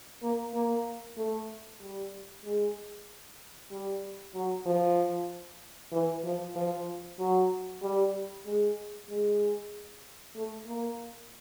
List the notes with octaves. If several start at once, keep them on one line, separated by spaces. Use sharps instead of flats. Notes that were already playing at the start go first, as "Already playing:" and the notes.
A#3
A#3
A3
G3
G#3
G3
F#3
F3
E3
F3
F3
F#3
G3
G#3
G#3
A3
A#3